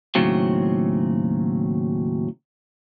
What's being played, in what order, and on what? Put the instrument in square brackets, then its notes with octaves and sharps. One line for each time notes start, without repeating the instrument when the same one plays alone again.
[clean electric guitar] D#2 A2 C#3 F#3 C4